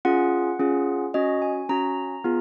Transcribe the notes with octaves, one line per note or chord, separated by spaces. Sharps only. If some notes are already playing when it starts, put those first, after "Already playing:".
C#4 F4 G#4 F#5
C#4 F4 G#4
C#4 F#4 D#5
G#5
C#4 F#4 A#5
B3 F4 G#4